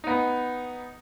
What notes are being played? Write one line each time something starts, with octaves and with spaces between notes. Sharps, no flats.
B3 D#4